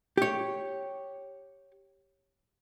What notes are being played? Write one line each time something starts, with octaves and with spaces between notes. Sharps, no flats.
G4 C#5